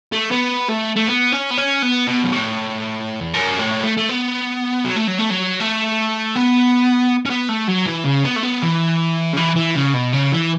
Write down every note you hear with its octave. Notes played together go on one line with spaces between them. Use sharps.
A3
B3
A3
A3
B3
C#4
B3
C#4
B3
B2
F#2
A2
E2
F#2
A2
A3
A3
B3
F#3
A3
F#3
A3
F#3
A3
B3
C#4
B3
A3
F#3
E3
C#3
B3
A3
B3
E3
C#3
E3
E3
C#3
B2
C#3
E3